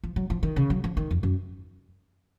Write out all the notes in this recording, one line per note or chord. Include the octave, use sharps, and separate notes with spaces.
F3
F#3
F3
D#3
C#3
F#3
F3
D#3
F2
F#2